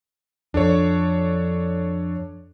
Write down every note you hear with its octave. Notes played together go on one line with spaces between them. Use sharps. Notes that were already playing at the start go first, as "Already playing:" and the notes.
F2 D4 A4 C#5